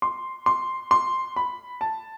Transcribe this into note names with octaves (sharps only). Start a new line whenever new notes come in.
C6
C6
C6
B5
A5